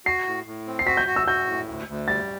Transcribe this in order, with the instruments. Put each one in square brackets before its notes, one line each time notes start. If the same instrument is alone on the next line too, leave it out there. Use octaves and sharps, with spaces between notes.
[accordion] F#4 [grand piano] C7
[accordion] A2
A2
C4
[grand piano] C7
[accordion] F#4 [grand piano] B6
[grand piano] G6
[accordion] F#4
[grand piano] E6
[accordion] F#4 [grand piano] G6
[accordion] A2
D2
D2
[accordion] G3 [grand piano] A6